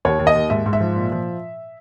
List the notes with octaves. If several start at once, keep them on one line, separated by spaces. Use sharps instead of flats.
D#2 C#5
D#2
D#5
D#2
G#2 E5
G#2
E5
F3
A#2
F3